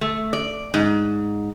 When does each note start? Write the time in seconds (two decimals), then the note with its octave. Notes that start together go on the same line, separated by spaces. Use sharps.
0.01 A3
0.33 D5
0.74 G#2